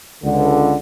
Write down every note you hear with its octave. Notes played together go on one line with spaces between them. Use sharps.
C#2 D3